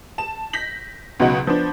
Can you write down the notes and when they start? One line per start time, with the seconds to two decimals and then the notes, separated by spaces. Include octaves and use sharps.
0.18 A5 E7
0.53 G6 A#6 B6 F#7
1.20 C#2 B2 F#3 D#4 F#5
1.47 F3 B3 D4